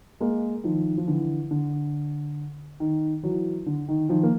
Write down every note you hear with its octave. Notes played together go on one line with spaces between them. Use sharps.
G#3 A#3
D#3 F3
F3
D3 E3
D3
D#3
E3 F#3
D3
D#3
D#3 F3
A#3